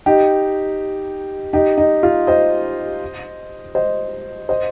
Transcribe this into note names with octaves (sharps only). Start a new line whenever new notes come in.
D#4 G4
D#4 G4
D#4
F4
C5 D#5
C5 D#5
C5 D#5